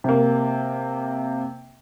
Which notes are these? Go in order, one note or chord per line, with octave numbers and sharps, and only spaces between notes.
C3 A#3